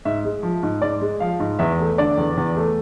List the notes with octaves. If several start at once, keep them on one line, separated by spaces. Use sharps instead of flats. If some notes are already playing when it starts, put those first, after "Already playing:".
G#2 E5
G#3
F3
G#2
G#2 D5
G#3
F3 F5
G#2
E2 E5
A3
D3 D5
E2
E2
A3